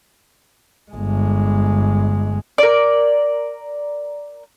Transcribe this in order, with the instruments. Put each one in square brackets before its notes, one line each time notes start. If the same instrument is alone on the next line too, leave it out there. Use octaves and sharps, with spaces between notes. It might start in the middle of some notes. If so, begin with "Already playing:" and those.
[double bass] G1 G#3
[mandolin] A#4 D5